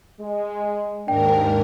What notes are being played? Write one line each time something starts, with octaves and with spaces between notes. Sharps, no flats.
G#3
D#2 G#2 A#3 D4 A#4 G5